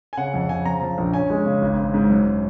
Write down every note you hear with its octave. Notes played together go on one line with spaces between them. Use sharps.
G#5
C#3 F#5
F2
C#3 G#5
F3 A#5
F3
A#1
C#4 G#5
G#3
C#3
G#1
G#2
G#2
F#2